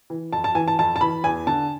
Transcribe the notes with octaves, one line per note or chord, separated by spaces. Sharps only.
E3
F2 A5
A5
E3 G#5
A5
F2 A5
A5
E3 B5
E2 G#5
D3 A5